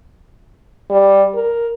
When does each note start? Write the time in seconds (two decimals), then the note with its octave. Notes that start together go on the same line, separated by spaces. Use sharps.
0.90 G3
1.35 A#4